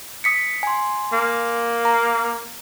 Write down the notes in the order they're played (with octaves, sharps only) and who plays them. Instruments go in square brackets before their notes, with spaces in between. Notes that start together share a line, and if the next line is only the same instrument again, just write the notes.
[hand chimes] D#6 B6 C#7
G#5 C6
[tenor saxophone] A#3
[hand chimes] A#5